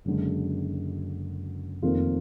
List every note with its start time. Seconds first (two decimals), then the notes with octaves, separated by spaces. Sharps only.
0.05 F#1 F#2 D3 G#3 D4
1.82 F1 F2 D#3 A#3 F4